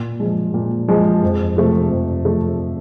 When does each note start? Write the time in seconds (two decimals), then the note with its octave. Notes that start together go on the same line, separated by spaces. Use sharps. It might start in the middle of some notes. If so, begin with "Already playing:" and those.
Already playing: A#2
0.20 F3 G#3
0.54 A#2
0.88 F3 G#3
1.23 F2
1.57 C3 F3 A3
1.90 F2
2.25 C3 F3 A3